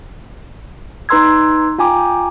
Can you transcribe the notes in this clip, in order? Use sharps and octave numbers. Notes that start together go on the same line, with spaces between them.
D#4 B4 A#5 C6 E6 G#6
F4 G5 G#5 A#5 D6